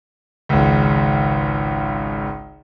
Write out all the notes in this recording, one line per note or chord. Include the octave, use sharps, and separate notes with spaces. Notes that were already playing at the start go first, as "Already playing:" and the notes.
G#1 C#2